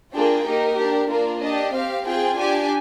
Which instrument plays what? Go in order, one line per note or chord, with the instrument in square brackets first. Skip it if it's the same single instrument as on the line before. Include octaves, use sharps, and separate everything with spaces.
[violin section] A#3 D4 F4 G#4 G5
A#3 D#4 G4 A#4
D4 G4
A#3 D4 F4 A#4
D4 G4 D#5
C4 G4 F5
C4 F4 G#4 G5
D4 G4 G#5